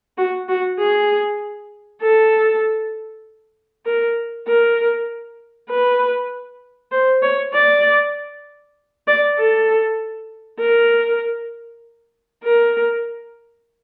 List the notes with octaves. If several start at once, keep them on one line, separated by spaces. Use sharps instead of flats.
F#4
F#4
G#4
A4
A#4
A#4
B4
C5
C#5
D5
D5
A4
A#4
A#4